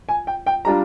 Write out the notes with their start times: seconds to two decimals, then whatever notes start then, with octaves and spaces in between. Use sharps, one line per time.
0.09 G#5
0.27 G5
0.47 G5
0.65 G3 D4 F4 A#5